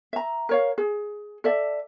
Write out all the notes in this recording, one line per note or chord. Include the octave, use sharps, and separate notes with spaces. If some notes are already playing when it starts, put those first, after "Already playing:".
E5 A#5
A#4 C#5 F5
G#4
A4 D5 E5